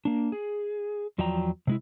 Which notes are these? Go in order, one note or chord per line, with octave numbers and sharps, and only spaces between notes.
A#3 D4
G#4
E2 F3 F#3 D5 G5 A#5
C3 G#3 E4